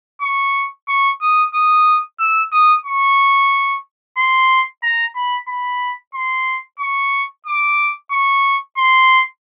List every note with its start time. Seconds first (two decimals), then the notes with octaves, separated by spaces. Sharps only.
0.22 C#6
0.88 C#6
1.21 D#6
1.54 D#6
2.20 E6
2.52 D#6
2.85 C#6
4.17 C6
4.83 A#5
5.15 B5
5.48 B5
6.14 C6
6.79 C#6
7.46 D6
8.11 C#6
8.77 C6